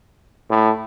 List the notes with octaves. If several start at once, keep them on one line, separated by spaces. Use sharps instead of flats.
A2